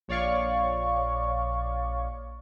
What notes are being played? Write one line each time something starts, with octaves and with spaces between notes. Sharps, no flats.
A#1 C#5 D5 F5 C#6